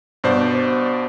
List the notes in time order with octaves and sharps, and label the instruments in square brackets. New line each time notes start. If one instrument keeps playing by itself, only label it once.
[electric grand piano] G2 B2 C5 D5